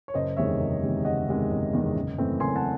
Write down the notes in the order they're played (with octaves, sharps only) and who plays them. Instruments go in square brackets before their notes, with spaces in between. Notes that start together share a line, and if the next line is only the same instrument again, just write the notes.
[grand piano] C#5
F#1 C5 D#5
E2 C3 D#3 G#3 C#5 E5
F#1
E2 C3 D#3 G#3
F#1 D#5 F#5
E2 C3 D#3 G#3
F#1
E2 C3 D#3 G#3
F#1
F#2 E3 A3 C4
F#1 G#5 C6
F#5 A5